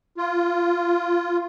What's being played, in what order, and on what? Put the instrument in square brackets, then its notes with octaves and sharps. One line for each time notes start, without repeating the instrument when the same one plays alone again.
[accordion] F4